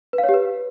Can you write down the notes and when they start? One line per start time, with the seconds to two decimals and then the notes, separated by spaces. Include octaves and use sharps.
0.13 B4
0.18 F5
0.24 C#5
0.29 G4
0.34 B4